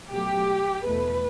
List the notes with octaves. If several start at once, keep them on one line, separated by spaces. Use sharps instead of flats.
B2 F#3 A3 G4
E2 B2 A3 B4